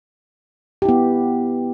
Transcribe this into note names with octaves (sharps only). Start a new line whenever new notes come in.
B3 E4 G4